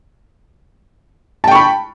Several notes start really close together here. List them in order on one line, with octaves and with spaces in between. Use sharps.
A5 G5 C#6 B5